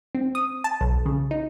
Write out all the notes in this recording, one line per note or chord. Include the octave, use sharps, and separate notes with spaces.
C4
D#6
A5
B1
C#3
D#4